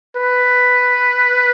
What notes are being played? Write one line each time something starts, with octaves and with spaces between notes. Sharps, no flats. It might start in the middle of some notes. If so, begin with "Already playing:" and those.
B4